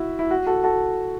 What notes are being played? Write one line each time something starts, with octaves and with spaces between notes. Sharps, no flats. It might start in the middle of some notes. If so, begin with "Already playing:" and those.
Already playing: E4 F#4
E4
F#4
F#4 A4
F#4 A4